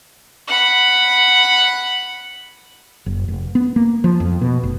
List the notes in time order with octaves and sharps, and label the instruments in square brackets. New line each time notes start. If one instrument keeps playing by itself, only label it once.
[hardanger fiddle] F#5 B5
[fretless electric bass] F#1
F1
B3
A#3
F3
F2
B2
F1